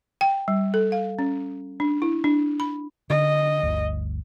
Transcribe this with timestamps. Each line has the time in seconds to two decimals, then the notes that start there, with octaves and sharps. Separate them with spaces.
0.21 G5
0.48 G3
0.74 A4
0.92 F5
1.19 C#4
1.80 D4
2.02 E4
2.24 D4
2.60 B5
3.10 D3 D#5
3.63 G1 D2